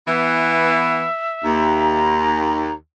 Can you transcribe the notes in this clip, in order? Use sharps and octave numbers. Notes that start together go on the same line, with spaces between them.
E3 B3 E5
D#2 A#5